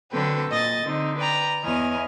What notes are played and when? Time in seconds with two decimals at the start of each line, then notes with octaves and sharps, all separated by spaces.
0.11 D3 F#3 C4 A4 B4 G5
0.51 A#2 D#5 A6
0.86 D3 C4 D#4
1.18 B4 D5 G5 A#5
1.64 E2 C#5 D#5 G#5 F6